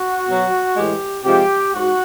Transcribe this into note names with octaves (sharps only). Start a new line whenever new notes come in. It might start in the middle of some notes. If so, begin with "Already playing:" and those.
Already playing: F#4
B2 F#3
A2 E3 G#3 G4
C3 F3 G#3 G4
G#2 F#4